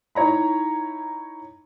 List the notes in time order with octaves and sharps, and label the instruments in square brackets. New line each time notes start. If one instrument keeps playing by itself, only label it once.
[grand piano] D#4 E4 C#5 A#5 B5